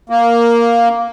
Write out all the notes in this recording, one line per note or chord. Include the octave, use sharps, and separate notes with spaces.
A#3